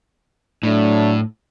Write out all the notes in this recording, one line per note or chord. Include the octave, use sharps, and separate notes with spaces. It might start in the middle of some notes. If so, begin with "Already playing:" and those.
A2 F#3 A3 D4